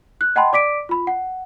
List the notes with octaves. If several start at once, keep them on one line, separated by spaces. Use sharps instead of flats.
F#6
D#5 F#5 G5 A5 B5 C6
D5 D6 B6 D7
F4 B5
F#5